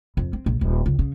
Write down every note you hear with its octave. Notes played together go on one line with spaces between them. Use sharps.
F2
C4
A#1
D#1
C#2
C#3